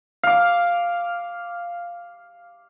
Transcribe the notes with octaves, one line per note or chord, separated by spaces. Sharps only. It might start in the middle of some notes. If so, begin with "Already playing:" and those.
F5 D6